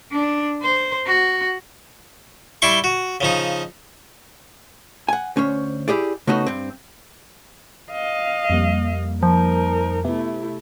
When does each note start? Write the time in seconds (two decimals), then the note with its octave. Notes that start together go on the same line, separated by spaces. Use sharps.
0.11 D4
0.62 C5
1.06 F#4
2.62 G3 E4 G5 C6 C#6
2.84 F#4
3.21 C#3 F3 D#4
5.09 F#5 G#5
5.36 D2 C#4 C5 C#5
5.88 E4 G4 G#4 D5
6.27 C#3 A3 B3 D#4 F#4
6.46 G2 C4
7.91 D#5 F5
8.50 F2 G3 A#3
9.23 F3 D#4 A#4
10.05 C3 A3 B3 E4